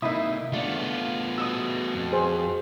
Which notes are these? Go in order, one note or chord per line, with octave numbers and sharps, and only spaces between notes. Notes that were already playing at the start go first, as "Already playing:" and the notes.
C3 A#3 D#4 E4 E5 B5 D#6
A3 B3 D4 F4
F#4 D#5 D#6 E6
F2
G#4 C5